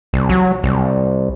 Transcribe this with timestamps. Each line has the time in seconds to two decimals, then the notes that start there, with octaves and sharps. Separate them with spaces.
0.13 C2
0.29 F#3
0.64 C2